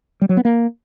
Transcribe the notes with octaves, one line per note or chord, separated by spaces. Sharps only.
G3
F#3
B3
A#3